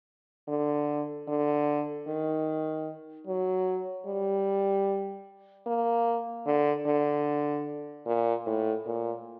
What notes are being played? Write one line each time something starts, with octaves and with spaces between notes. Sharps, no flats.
D3
D3
D#3
F#3
G3
A#3
D3
D3
A#2
A2
A#2